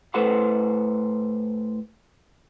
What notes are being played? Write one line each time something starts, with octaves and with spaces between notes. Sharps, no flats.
A2 A4 B4 C5 F#5 C6